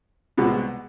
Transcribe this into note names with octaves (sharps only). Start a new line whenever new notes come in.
C2 B2 G#3 B3